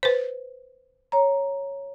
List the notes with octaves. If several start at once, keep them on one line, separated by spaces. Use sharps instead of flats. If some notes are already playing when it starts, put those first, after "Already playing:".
B4 C5
C#5 A#5